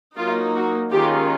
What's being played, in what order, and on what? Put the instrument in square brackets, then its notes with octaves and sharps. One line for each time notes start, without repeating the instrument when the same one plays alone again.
[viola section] F#3 A#3 D#4 F4
F#4
D#3 G#3 C#4 F4 G4